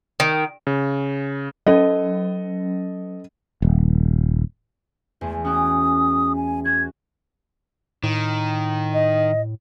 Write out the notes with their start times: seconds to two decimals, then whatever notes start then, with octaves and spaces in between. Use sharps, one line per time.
0.20 D#3
0.67 C#3
1.66 F#3 C#4 A4 D#5
3.62 D#1
5.21 E2 G#3 A3
5.45 C#4 F#4 G5 D#6
6.36 G#5
6.65 F#4 G#6
8.04 A2 D#3
8.94 D#5